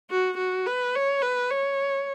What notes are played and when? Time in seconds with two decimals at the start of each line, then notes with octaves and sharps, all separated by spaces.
0.10 F#4
0.38 F#4
0.66 B4
0.95 C#5
1.22 B4
1.51 C#5